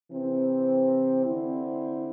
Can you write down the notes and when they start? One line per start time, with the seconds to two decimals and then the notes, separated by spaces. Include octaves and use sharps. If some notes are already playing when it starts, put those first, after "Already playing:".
0.12 C3 E3 C4
1.24 D3 C4 E4